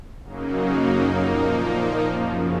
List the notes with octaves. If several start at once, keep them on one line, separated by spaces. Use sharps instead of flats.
F#2 C#3 F#3 A#3 D#4
A#2 F3 A#3 D#4
F#2 C#3 F3